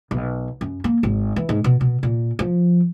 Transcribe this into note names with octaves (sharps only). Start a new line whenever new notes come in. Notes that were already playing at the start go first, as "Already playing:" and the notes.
B1
F#2
A#3
G#1
E3
G#2
B2
B2
A#2
F3